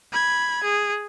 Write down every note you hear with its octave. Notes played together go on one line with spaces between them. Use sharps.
B5 G#6
G#4